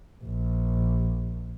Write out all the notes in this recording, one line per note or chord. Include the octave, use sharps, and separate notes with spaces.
A#1